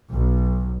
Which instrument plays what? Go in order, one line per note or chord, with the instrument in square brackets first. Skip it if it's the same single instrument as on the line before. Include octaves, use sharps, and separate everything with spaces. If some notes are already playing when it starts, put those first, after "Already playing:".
[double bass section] B1